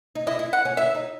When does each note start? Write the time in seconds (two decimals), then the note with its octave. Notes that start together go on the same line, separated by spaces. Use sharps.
0.15 D#4
0.27 E4 D#5
0.39 E4
0.53 F#5
0.65 C#4
0.77 E4 E5
0.95 D#4